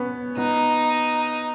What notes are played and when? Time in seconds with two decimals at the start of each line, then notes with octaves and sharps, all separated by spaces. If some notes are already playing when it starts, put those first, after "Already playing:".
Already playing: B3 C#4
0.37 B3 D#4